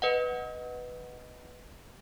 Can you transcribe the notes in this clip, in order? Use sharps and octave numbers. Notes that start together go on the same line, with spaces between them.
B4 D#5 F#5